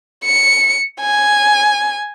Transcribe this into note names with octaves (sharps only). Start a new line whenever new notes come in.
C#7
G#5